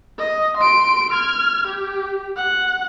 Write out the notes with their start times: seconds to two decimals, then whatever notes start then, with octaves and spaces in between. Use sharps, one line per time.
0.18 D#5
0.57 C6 D7
1.13 F6 G#6
1.67 G4
2.37 F#5